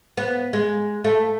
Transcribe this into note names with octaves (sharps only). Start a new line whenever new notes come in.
B3
G#3
A3